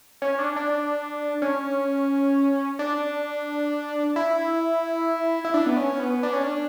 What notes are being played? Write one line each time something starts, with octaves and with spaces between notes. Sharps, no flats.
C#4
D4
D4
C#4
D4
E4
E4
D4
B3
C#4
B3
D4
C#4
D4